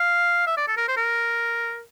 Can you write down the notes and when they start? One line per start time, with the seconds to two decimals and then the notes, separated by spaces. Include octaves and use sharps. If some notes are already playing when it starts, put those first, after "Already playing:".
Already playing: F5
0.47 E5
0.57 D5
0.68 A4
0.77 A#4
0.88 C5
0.97 A#4